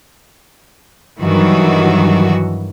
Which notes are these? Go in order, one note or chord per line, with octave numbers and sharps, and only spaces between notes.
G2 D#3 E3 F#3 F#4